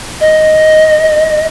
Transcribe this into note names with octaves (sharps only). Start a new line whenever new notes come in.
D#5